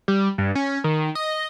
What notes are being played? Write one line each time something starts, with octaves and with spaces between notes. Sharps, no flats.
G3
G2
C#4
D#3
D#5